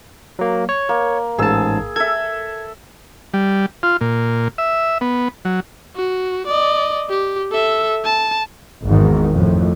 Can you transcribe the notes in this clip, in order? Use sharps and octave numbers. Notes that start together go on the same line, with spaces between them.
F#3 A#3
C#5
A#3
A1 G#2 G#4 A5 E6
A4 E5 G#6
G3
F4
A#2
E5
B3
F#3
F#4
D5 D#5
G4
A4 E5
A5
G#1 E2 G#2 D#3
F2 A2